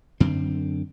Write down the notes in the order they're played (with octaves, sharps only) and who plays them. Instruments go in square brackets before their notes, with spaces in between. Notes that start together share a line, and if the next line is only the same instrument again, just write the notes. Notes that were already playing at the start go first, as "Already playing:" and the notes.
[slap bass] F#2 D3 C4